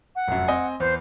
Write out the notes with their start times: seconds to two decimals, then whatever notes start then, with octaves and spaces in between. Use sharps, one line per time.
0.16 F#5
0.28 F1 F#2
0.48 C4 D#5 G#5
0.80 E2 C5